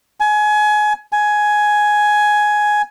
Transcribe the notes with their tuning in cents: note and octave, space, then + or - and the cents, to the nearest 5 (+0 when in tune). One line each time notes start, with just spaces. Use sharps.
G#5 +25
G#5 +10